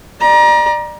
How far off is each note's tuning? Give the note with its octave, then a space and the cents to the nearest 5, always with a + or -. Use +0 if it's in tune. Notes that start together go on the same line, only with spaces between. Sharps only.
D5 +35 A#5 +30